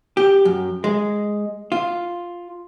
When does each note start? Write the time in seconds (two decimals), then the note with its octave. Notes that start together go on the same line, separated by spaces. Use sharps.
0.17 G4
0.45 F#2
0.84 G#3
1.72 F4